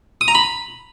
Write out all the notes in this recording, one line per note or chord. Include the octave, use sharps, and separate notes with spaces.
D#6
A#5
B5